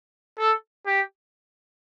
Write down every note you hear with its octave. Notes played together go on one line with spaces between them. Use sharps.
A4
G4